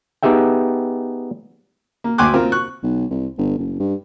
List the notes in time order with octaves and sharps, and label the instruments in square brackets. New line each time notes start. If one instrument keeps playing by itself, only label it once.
[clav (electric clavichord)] B3 D#4 G4 G#4 E5 G5
[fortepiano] A#3
D2 G5 G#5 C6 D6 F#6
C4 F4 A#4
C#6 F#6
[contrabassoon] B1
C2
G1
F#1
G2